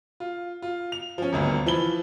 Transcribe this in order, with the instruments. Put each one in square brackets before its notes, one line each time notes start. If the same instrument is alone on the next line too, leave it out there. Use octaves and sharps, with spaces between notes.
[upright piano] F4
F4
F7
F3 C#4
D#1 G#1 D2 B3
E3 F3 B5 G7